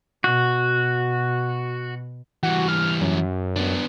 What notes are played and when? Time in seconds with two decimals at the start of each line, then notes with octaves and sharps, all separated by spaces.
0.24 B2 F#4
2.43 E3 G3 F#4
2.68 F6
3.01 F#2
3.56 B3 D4